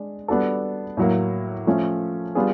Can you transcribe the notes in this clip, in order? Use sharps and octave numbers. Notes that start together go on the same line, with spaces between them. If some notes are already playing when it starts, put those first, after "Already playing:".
Already playing: G#3 D4
G3 B3 D4 F#4 A4
A2 F#3 A#3
F3 A3 C#4
G3 B3 D4 F4 G#4